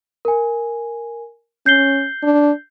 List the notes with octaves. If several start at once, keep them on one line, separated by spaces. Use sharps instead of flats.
A#4 G#5
C#4 G6 C7 G7
D4